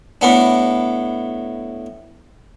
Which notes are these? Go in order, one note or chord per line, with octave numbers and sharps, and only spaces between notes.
A2 B3 D4